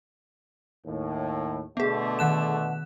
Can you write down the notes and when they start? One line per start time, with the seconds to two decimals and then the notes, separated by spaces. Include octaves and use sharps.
0.87 D#2 A2
1.77 B2 D3 A3 B3 G#4
2.19 D#3 F#6 E7